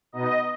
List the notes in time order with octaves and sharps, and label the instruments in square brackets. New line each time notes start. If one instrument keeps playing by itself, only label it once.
[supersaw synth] B2 B3 D#4 D#5